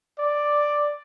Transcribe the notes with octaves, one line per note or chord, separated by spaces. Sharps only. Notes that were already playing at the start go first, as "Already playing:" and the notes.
D5